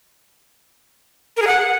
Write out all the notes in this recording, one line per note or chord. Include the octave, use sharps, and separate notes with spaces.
A#4
G#4
F#5